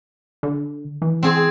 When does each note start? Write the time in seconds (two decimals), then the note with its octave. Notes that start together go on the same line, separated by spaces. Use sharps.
0.43 D3
1.02 E3
1.23 C4 G#4